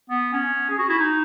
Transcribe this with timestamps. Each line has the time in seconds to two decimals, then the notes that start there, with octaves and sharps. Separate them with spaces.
0.10 B3
0.32 C#4
0.69 G#4
0.78 F#4
0.89 E4
0.99 D#4